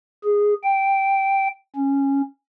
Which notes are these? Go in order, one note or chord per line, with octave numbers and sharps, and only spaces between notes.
G#4
G5
C#4